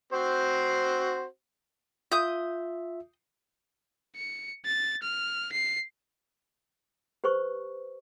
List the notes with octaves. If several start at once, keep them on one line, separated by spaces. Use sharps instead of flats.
C4 F#4 C5
F4 E5 D#6 G6
C#7
A6
F6
C7
G4 B4 C5 C#6